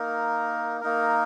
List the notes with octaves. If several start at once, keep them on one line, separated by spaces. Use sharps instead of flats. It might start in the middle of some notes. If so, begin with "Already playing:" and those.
Already playing: A#3 D#4 A#4
A#3 D#4 A#4